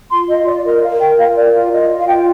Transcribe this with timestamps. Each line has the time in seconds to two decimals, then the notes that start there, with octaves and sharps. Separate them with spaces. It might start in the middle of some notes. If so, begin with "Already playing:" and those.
0.11 F4 C6
0.29 F4 D#5
0.47 F4 D5
0.65 A#4 D#5
0.82 A#4 F5
1.00 A#4 G5
1.18 F4 F5
1.36 A#4 D5
1.54 F4
1.72 F4 D#5
1.90 F4
1.97 F5
2.07 F4 G5